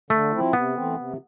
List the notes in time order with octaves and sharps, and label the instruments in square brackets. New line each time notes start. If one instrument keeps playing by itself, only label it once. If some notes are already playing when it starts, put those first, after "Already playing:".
[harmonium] D3 [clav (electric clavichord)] A3
[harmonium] F3 C4 E4
[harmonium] C3 [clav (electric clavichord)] B3
[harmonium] E3 A3 C4
C3